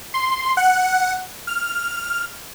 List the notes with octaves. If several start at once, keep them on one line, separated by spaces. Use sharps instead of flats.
C6
F#5
F6